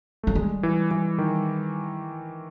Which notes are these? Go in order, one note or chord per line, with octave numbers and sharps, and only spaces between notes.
F#3 A3
G3 G#3
E3
E3
D#3